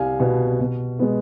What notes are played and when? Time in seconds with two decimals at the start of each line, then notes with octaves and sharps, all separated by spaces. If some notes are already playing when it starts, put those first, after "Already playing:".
Already playing: C2 F5 G#5
0.20 B2 B3
0.60 B2
0.99 G#3 B3